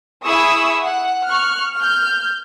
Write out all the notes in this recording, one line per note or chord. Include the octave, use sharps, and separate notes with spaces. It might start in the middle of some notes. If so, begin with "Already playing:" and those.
E4 G#4 B5 C#6 D#6 E6
F#5
C#6 F6 F#6
F6 G6